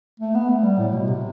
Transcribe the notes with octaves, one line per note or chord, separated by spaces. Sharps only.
A3
B3
A3
G3
A2
B2
C3